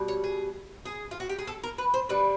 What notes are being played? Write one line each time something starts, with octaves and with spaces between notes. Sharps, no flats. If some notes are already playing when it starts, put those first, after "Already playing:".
Already playing: B2 G3
C#5
G#4
G#4
F4
F#4
G4
G#4
A4
A#4
B4
C5
D3 G3 B4